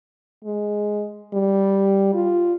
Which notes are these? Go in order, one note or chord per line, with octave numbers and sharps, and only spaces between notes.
G#3
G3
F4